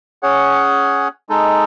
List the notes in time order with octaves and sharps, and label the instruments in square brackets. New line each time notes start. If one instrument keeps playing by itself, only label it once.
[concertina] C#4 G#4 C#5 F#5
G#3 D#4 A4